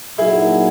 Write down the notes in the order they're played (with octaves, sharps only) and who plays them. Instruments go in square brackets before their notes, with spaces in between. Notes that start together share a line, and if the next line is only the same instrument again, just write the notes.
[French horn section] A#2 F#3 A#3 D#4 F#4 [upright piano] E4 G#4